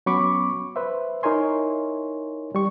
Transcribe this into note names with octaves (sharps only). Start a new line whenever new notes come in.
F#3 B3 C#4 B5 C#6 D6
B4 C5 E5
D#4 E4 A#4 C#5 G#5 C6
G3 C#6